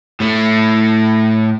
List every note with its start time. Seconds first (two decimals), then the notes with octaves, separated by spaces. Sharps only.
0.20 A2 A3